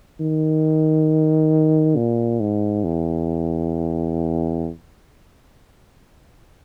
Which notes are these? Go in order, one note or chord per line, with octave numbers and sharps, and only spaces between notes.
D#3
A#2
G#2
E2